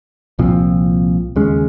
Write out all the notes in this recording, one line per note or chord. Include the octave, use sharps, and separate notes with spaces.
C2 A#2 F3 C4
D#2 C#3 G#3 C#4